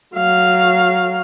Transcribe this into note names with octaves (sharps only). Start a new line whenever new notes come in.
F#3 F5